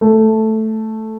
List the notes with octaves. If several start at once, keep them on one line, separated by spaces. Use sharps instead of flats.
A3